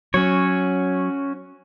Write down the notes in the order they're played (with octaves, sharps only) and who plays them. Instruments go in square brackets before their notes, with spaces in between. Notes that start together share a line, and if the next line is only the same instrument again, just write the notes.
[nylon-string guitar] F#3 [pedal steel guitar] C#4 F#4 C#5